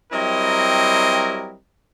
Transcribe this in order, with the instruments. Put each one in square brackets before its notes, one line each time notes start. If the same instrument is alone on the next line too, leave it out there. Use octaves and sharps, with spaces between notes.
[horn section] F#3 G3 C4 E4 A#4 D#5